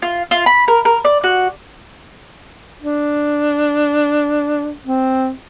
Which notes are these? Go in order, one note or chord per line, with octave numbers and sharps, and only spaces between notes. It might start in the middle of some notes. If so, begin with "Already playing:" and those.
F4
F4
B5
A#4
A#4
D5
F#4
D4
C4